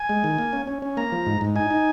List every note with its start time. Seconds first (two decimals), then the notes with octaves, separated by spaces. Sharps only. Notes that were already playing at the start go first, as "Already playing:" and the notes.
Already playing: G#5
0.09 G#3
0.24 D#3
0.38 A#3
0.53 C#4
0.67 C#4
0.82 C#4
0.97 A#3 A#5
1.12 F3
1.26 G#2
1.41 G#2
1.56 D#4 G#5
1.71 D#4